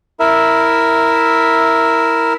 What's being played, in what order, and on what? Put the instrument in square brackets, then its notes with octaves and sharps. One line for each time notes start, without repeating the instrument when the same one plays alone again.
[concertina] E4 A#4 E5